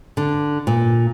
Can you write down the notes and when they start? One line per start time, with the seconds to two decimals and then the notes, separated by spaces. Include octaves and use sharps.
0.17 D3
0.67 A#2